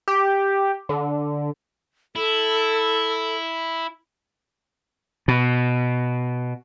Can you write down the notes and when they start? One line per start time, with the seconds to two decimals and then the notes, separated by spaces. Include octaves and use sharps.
0.08 G4
0.89 D3
2.16 E4 A4
5.28 B2